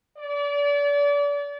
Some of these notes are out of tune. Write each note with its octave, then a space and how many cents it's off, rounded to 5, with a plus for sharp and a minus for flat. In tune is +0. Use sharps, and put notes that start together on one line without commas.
D5 -35